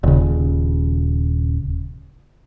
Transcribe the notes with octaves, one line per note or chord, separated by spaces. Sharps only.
D#1 C#3